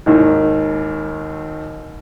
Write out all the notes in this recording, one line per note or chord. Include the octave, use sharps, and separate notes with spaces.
G#1 D#2 D#3